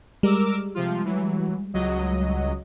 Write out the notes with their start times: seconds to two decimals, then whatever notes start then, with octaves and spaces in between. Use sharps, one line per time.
0.23 G3 G#3 A#4 D6 E6
0.75 C3 F3 F4
1.04 E3 F#3
1.73 C#2 F#3 D#5